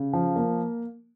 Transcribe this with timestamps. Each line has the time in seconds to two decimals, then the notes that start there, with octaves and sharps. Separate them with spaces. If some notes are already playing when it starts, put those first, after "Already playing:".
Already playing: C#3
0.13 F3
0.36 A#3